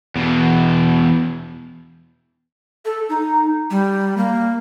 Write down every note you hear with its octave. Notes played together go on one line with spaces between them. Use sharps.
E2 B2
A4
D#4
G3
A#3